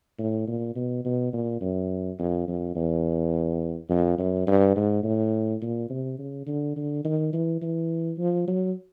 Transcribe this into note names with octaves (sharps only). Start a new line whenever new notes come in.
A2
A#2
B2
B2
A#2
F#2
F2
F2
E2
F2
F#2
G2
G#2
A2
A#2
C3
C#3
D3
D3
D#3
E3
E3
F3
F#3